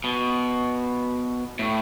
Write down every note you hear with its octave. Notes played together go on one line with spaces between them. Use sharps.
B2
A2